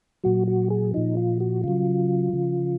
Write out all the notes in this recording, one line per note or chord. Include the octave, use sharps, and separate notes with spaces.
A#2 F#3 F#4
F#4
G#4
A#2 F3 D#4
F4
F#4
C#3 F#3 F4
C#3 F3